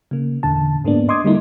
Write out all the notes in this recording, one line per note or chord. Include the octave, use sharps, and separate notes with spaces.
C#3 A#3
E2 A#2 D3 A5
G#2 G#3 A#3 B3 D4
D#5 C6 D6 D#6 G#6
D3 G3 A3 A#3 D#4 E4